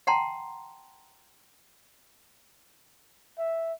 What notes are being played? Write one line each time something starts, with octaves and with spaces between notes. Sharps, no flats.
F#5 G5 A5 A#5 C6
E5